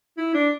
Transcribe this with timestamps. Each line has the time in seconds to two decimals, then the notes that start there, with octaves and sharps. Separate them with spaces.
0.18 E4
0.34 D4